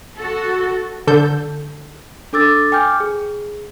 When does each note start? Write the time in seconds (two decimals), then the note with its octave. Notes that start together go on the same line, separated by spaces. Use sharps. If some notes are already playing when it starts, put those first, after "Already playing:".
0.16 F#4 A4
1.07 D3 A4 G6
2.33 D4 A4 D6 E6 A6
2.72 G5 G#5 D6 F6 G6
3.00 G#4